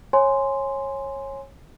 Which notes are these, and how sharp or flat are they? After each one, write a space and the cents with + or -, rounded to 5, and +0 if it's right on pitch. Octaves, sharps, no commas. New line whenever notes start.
C#5 -20 G#5 +0 C6 -5